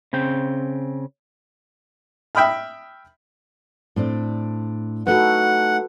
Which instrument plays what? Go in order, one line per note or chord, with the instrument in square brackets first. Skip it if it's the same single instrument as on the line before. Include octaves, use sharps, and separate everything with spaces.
[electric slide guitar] C#3 C4 G5
[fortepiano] E5 G5 B5 D#6 F6
[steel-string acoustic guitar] A2 C4 D4
[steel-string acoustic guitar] A3 D#4 [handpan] F#4 A4 B4 [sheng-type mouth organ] F#5